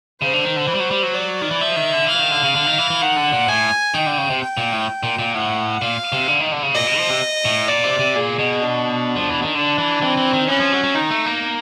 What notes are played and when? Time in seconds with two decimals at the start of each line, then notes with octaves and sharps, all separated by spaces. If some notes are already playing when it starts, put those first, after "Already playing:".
0.21 C#3 C5
0.33 D3
0.44 D#3
0.56 D3
0.68 E3
0.75 G3
0.80 F#3
0.91 G3
1.03 F#3
1.14 D5
1.42 D#3
1.51 E3
1.61 F3 E5
1.76 D#3
1.93 D3
2.08 E3 F5
2.19 D#3
2.31 D3
2.43 C#3
2.54 D3
2.67 D#3
2.78 E3
2.90 E3
3.01 D#3 F#5
3.16 D3
3.33 A#2
3.48 A2 G#5
3.94 D#3 G5
4.06 D3
4.18 C#3
4.30 C3
4.41 G5
4.57 A#2
4.72 A2
5.03 A#2
5.19 A#2
5.35 A2 F#5
5.81 A#2 F5
6.12 C3
6.28 D3
6.40 D#3
6.52 D3
6.63 C#3
6.75 A#2 D#5
6.87 B2
6.98 F3
7.10 C3
7.45 A2
7.68 A#2 D5
7.84 C3
7.99 C3
8.15 A#2 G#4
8.39 B2
8.62 D4
9.16 F3
9.30 E3
9.42 D#3
9.55 D3 D4
9.78 E3
10.02 E3 C4
10.17 E3
10.33 D#3
10.49 E3 C#4
10.60 F3
10.73 F#3
10.84 F#3
10.95 D#3 D#4
11.10 A3
11.26 A#3